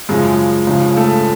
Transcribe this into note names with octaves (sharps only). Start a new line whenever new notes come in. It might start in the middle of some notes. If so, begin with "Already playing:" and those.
F#2 C#3 F3 G#3
C#2 C#3 F3
A3